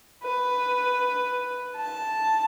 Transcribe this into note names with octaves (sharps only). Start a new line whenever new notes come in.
B4
A5